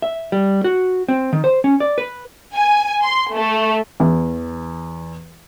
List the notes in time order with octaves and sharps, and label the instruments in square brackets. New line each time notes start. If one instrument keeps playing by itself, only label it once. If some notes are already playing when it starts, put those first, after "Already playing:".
[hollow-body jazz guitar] E5
G3
F#4
C4
D#3
C5
C#4
D5
B4
[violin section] G#5
C6
A3
[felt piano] E2